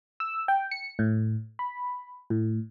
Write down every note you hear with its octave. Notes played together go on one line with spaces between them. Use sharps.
E6
G5
C#7
A2
B5
A2